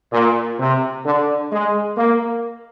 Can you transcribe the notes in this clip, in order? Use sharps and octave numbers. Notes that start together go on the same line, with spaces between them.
A#2
C3
D3
G#3
A#3